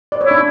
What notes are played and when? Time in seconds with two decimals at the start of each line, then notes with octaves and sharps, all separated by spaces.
0.12 D5
0.21 C#5
0.26 D4 E4